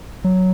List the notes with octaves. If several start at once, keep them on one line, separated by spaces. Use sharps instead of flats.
F#3